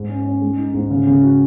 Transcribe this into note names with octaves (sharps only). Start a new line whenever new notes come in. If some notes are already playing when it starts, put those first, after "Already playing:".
Already playing: G#2
C#4
C#4
G#3
D#4
G#2
C#3
C#3
F#4